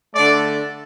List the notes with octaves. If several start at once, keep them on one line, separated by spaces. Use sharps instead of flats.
D3 A3 D5